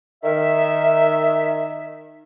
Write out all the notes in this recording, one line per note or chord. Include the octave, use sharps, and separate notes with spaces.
D#3 E5